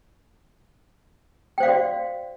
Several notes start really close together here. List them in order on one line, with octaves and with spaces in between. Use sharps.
G5 C5 F5 D5 F#4